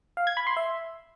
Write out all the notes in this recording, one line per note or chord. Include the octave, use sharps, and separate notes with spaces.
F5
G#6
B5
C6
E5